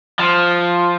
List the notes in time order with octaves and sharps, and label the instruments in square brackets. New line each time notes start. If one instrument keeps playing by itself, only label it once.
[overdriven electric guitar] F3